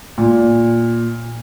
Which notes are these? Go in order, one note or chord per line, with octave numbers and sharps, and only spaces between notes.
A#2